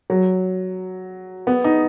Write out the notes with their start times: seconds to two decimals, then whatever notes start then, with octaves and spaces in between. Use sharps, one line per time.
0.10 F#3
1.47 B3
1.64 D#4